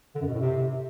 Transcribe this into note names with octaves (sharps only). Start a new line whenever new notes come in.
D3
F#2
B2
A2
C3